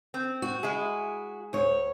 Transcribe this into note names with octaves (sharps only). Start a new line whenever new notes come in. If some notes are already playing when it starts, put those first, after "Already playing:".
C4
F#4
G#3 E4 G#4
D2 C#5